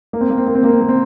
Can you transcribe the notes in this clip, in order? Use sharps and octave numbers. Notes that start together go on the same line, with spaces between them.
A#3
C4
A#3
C4
A#3
C4
A#3
C4
A#3
C4